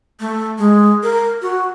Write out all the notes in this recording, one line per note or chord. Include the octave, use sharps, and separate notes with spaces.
A3
G#3
A#4
F#4